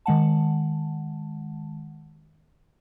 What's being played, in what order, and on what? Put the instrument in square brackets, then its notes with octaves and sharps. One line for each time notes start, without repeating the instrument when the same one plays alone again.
[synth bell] D#3 G#3 F#5 A5